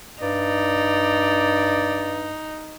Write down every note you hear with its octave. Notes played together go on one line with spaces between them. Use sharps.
G2 D#4 D5